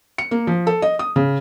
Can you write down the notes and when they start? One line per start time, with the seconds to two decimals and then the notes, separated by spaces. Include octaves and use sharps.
0.18 C#7
0.31 A#3
0.47 F3
0.67 A4
0.82 D#5
0.99 D#6
1.16 C#3